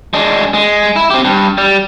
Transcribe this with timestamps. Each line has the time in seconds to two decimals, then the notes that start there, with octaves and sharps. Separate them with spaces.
0.14 G#3 D4
0.54 G#3
0.96 E4
1.11 C4 G4
1.25 G2
1.58 G3